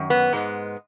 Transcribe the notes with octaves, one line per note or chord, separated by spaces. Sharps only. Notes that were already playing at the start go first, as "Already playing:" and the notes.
Already playing: F#2 D#3
B3
G#2 G#3 B3